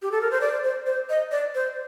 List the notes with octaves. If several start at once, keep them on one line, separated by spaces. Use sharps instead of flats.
G4
A4
A#4
C5
D5
C5
C5
D#5
D5
C5